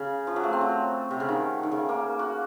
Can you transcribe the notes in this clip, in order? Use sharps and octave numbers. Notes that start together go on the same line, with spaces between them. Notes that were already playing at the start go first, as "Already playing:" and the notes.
Already playing: C#3
F3
F#3
A3
C4
F#3
C3
C#3
D#3
D#3
C#3
A#3
F#4